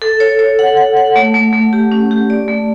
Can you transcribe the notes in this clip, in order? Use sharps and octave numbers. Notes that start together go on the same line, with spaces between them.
A4
C#5
C#5
F#5
F#5
F#5
A3
A3
A3
G4
C#4
G4
D5
A3